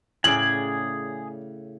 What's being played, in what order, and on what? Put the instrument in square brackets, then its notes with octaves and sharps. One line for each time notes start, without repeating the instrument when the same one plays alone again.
[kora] A2 C#3 D5 [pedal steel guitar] G#4 G#5 [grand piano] F#7